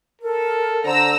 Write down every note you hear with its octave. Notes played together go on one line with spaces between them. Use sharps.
A4 A#4
D3 C5 A#5 E6